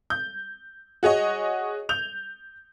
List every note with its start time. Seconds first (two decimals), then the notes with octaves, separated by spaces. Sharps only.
0.10 G6
1.03 F#4 G#4 C#5 D#5
1.89 G6 F7